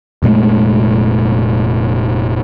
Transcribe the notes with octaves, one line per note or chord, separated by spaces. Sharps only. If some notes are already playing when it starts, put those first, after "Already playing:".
F1 A#2 G#3 A3